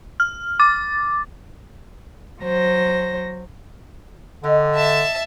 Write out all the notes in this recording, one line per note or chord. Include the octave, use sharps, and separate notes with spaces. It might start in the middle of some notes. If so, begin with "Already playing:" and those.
F6
D6 A6
F#3 C5 A#6
D3 D#4 G4 D#5
E5 A5